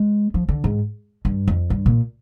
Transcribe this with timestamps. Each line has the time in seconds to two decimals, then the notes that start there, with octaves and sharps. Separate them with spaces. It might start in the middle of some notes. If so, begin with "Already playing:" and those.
Already playing: G#3
0.34 F3
0.49 D3
0.64 G#2
1.25 G2
1.48 F2
1.70 G2
1.86 A#2